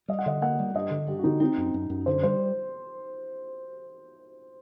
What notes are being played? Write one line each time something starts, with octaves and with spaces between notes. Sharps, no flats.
G3 D#5
F#5
D3 D#5
A#3 F#5
G3
G2 D#5
D3
G2 G4
F#4
D3 D#4
C4 D#4
F#2
F#2
F#2
D3 C5
G3 C5